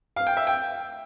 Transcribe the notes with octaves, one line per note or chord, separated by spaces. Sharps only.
F5
G5
E5
G5